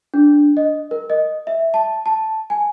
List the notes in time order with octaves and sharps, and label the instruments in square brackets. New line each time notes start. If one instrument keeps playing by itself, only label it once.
[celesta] D4
D#5
A#4
D#5
E5
A5
A5
G#5